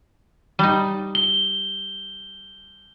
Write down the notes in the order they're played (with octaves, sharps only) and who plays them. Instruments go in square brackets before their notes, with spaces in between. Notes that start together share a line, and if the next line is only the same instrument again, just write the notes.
[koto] G3 D#4
[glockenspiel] G7